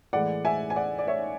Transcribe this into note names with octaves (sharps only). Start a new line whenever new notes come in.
A2 E3 G#3 D5 F#5
E5 G#5
G#5
D5 F#5
D5
C#5 E5